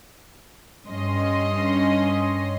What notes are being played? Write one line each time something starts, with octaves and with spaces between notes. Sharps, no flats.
G2 C#4 D#5 C6